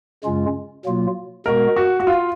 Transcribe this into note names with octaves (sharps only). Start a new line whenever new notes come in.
F#2 C#3 G#3 C#4 F4
B2 F#3 A#3 F4
B2 G#3 B3 F#4 A#4
F#4
F#4
F4